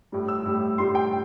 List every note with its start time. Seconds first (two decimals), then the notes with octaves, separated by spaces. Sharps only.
0.12 A2 G3
0.28 E6
0.45 A2 G3
0.78 A2 G3 C6
0.95 G5